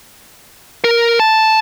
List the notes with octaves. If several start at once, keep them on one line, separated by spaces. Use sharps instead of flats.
A#4
A5